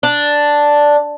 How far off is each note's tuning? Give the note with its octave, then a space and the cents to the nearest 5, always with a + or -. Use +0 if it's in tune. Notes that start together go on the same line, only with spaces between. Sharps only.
D4 +0